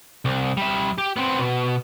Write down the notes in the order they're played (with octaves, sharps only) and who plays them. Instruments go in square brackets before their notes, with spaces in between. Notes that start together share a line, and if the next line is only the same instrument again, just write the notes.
[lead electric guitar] C2
G3 E5
G4
B3 C4
B2